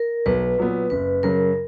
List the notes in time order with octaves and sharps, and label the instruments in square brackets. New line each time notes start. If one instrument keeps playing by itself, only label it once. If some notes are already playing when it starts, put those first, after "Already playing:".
Already playing: [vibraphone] A#4
[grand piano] B1 [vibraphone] B4
[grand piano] A#2 F#3 B3
[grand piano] F#1 [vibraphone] B4
[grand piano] F#2 C#3 F#3 [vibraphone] A#4